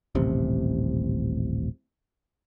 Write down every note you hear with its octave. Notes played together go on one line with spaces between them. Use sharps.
D#1 A1 C3